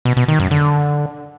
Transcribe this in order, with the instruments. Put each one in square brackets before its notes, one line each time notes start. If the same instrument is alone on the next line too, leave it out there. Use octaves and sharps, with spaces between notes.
[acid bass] B2
B2
D#3
F#2
D3